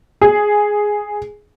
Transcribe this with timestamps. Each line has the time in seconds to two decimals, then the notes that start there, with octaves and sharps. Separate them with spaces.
0.21 G#4